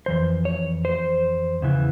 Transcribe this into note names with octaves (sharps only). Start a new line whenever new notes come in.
F2 E3 C5
C#5
C5
E2 C#3 E3